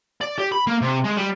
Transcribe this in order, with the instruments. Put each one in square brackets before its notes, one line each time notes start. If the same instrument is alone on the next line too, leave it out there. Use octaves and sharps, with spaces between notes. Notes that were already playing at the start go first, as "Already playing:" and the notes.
[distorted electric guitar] D5
G4
B5
A#3
C3
G#3
G3